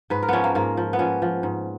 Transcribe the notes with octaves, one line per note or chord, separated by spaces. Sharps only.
G#2 B4
A#4
F3 B3 C#4
A#3
G#2 A#3
F3
B3
F3 C#4
F3
G#2